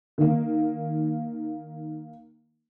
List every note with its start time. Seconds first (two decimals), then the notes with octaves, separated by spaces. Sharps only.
0.18 D#3 A#3